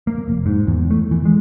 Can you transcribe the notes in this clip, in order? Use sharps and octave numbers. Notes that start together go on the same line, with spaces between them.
A#3
F1
G#2
E2
A3
E3
G#3